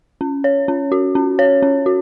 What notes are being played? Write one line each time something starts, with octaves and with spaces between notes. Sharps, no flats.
C#4
C#5
C#4
F#4
C#4
C#5
C#4
F#4